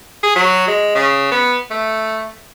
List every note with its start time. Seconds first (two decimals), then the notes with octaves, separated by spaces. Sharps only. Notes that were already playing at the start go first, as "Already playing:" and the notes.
0.23 G#4
0.36 F#3
0.68 G#3
0.95 C#3
1.32 B3
1.71 A3